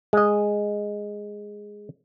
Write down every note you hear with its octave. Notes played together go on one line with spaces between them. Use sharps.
G#3 D#5